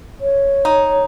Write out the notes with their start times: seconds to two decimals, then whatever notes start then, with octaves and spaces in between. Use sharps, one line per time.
0.21 C#5
0.65 D#4